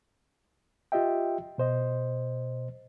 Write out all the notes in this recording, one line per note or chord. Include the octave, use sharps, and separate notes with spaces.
F4 G4 D#5 E5 G5
B2 C5 D#5